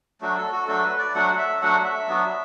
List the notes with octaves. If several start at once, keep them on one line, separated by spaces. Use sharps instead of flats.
F#3 A3 D4 F#4
A4
F#4
F#3 A3 D4 F#4 A4
B4
D5
F#3 A3 D4 F#4 F#5
E5
F#3 A3 D4 F#4 F#5
E5
F#3 B3 D4 F#4